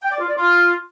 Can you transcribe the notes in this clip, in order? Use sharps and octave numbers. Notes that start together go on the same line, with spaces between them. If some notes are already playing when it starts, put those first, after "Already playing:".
G5
D5
F4
D5
F4